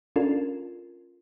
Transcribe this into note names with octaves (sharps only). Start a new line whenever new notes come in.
C#4 D4 F4 A4 A#4